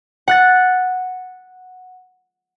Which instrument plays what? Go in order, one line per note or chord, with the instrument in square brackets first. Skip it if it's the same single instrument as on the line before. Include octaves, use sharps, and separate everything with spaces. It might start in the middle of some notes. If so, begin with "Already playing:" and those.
[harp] F#5 F#6 A6